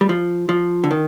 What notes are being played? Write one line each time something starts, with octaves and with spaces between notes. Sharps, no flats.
G3
F3
F3
D3
D#3